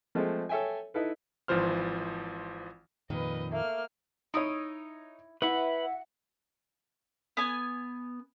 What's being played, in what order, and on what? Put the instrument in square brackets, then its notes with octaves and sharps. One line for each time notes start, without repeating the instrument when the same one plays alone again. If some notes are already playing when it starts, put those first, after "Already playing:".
[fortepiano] F3 G#3 A3 C4
A4 C#5 E5 G5 G#5
D#4 E4 A4 B4
[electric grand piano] G#1 E3 F3 C5 F6
[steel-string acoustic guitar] F2 A#2 D#3 [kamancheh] B4 D#5
[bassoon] A3 [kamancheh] A#3 F6
[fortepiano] D#4 C#5 [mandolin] E4 D#6
[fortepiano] E4 [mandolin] F#4 [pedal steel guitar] B4 B5 [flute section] E5 F#5
[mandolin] B3 G#5